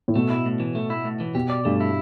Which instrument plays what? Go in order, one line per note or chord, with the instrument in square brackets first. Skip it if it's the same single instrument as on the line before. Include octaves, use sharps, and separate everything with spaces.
[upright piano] A2
[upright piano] B2 [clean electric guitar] A3
[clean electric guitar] E4
A2
E3
A3
E4
A2
E3
[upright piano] B2 [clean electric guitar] G4
[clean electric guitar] D5
[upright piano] G2 [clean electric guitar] A3
[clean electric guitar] E4